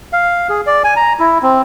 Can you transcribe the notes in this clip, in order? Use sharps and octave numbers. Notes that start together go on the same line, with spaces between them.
F5
G#4
D5
G#5
A#5
E4
C4